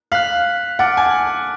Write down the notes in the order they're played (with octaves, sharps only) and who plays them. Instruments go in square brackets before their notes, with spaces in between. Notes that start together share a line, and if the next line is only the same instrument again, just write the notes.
[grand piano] F5 [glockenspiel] F#6 B6 F#7
[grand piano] F#5 [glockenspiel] A5 D6 F6 A6 D7
[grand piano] G#5